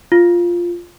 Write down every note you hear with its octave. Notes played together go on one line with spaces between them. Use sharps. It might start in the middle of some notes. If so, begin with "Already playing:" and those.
F4